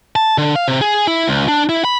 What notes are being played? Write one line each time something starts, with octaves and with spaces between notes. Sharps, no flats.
A5
D3
F5
C3
G#4
E4
C#2
D4
E4
B5